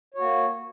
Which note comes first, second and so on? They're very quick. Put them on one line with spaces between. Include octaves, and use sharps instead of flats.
C#5 F#4 A#3